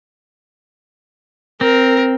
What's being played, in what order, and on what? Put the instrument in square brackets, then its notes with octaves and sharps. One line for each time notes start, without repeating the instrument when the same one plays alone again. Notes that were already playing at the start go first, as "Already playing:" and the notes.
[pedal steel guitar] C4 [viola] A#4